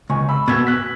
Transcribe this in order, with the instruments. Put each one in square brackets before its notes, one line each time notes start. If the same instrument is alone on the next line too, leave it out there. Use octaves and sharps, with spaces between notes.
[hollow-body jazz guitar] C#2 [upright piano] G#5 C#6
[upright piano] B5 E6
[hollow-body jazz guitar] B2 B3 [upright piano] E6 G#6
[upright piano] F#6 B6